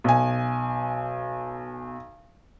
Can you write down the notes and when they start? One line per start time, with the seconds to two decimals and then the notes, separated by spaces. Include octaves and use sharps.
0.04 B1 G#5